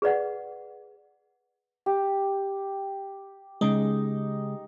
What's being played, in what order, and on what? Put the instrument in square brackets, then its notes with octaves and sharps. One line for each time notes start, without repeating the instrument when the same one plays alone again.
[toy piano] G#4 B4 D5 F#5
[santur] G4
[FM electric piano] C#3 G#3 [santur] D#4